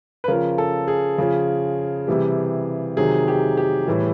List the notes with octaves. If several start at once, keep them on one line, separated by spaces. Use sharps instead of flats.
B4
C#3 F3 A#4
A4
G#4
C#3 F3
C3 E3 G3
C3 D#3 F#3 G#4
G4
G4
A2 E3 G3